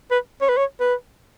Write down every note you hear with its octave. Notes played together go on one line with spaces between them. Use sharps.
B4
C#5
B4
C#5
B4